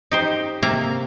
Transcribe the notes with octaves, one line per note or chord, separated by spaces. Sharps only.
D#4 G4 C5
C3 A#3 E5 A#5